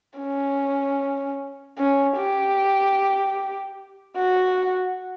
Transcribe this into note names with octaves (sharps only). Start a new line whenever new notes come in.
C#4
C#4
G4
F#4